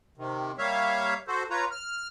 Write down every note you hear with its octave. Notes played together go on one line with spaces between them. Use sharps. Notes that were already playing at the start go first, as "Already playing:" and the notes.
C3 D#3
G3 A#3 C#5 E5 F5
F#4 A4 C5
F4 B4 C#5 A#5
F6